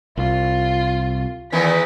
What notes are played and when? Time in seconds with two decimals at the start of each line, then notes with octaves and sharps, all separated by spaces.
0.17 C2 F4
1.52 E2 D#3 E3 B6